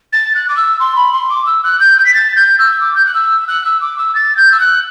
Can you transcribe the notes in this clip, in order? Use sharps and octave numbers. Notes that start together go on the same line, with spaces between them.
A6
F#6
D6
E6
C6
B5
C6
D6
E6
F#6
G6
G6
B6
A6
G6
E6
D6
G6
F#6
E6
F#6
E6
D6
E6
A6
G6
E6
F#6